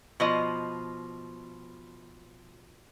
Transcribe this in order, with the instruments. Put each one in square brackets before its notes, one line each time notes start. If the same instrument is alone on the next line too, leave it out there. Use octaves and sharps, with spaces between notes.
[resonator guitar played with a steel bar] B2 F3 D#5